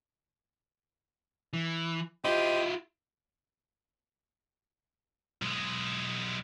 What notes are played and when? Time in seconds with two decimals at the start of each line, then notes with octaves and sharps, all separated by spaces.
1.53 E3
2.25 E4 F4 G4 C5 D#5
5.42 B1 G#3